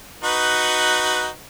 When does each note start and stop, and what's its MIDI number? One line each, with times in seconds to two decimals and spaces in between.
0.24 1.28 63
0.24 1.28 66
0.24 1.28 71